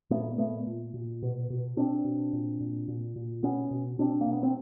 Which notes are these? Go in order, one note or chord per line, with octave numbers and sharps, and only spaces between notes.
A#2 A3 B3
A#2 A3 B3
A#2
A#2
B2
B2
B2 C4 D4
B2
A#2
A#2
A#2
A#2
B2 B3 C#4
B2
B2 C4 D4
A#3
B2
B3
C4